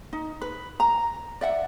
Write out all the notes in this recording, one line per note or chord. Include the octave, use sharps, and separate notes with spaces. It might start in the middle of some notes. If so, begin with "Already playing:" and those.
D#4
B4
A#5
D5 E5 F#5